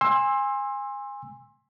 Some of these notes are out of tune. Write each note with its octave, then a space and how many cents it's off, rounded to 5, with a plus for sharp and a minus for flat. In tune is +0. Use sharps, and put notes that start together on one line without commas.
G#5 -25 C6 +20 E6 +0